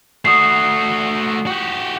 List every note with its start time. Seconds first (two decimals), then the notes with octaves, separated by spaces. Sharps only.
0.25 A3 F#4 D#6 C7
1.46 F#4 G4